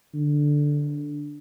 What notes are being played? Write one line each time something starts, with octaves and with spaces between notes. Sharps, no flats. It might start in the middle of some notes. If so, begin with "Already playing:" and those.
D3